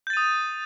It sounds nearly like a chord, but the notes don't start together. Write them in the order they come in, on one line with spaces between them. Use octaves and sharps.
G6 A6 D#7 D#6